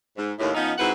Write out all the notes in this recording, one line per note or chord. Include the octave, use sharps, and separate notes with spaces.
G#2
D#2 A2
F3 B3 C#4 D#4
G#2 C4 E4 F#4 B4 F#5